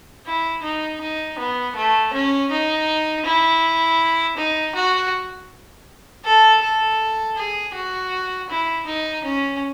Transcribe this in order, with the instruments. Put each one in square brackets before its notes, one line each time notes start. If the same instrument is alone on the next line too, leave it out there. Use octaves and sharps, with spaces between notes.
[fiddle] E4
D#4
D#4
B3
A3
C#4
D#4
E4
D#4
F#4
A4
A4
G#4
F#4
E4
D#4
C#4